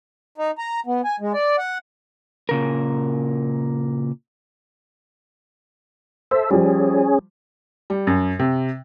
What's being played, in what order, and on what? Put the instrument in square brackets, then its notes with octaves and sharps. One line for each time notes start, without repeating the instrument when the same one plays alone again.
[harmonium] D#4
A#5
B3
G#5
G#3
D5
F#5
[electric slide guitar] A#2 C#3 A#4
[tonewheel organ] A4 E5 [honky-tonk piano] C5
[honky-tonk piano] F3 G3 [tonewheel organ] C#4 G#4
[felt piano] G3
F#2
C3